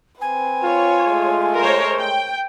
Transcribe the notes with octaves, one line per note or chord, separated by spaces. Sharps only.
C4 B4 G#5
F4 C#5
G#3 A3
A#4 C5 C#5
G5